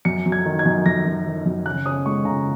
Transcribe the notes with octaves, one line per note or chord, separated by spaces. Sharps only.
F#2 C#7
F#3
G#6
D#3
G#6
F#2
F#2 A#6
F#3
D#3
F#2
C#3 F#6
C#4 D#6
G#3 C#6
C#3 A#5